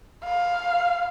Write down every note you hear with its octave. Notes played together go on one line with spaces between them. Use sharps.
F5